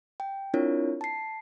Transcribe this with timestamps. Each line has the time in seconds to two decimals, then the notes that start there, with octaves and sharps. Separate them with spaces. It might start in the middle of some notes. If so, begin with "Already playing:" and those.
0.20 G5
0.54 C4 D4 E4 F4 A#4 C#5
1.01 A5 C7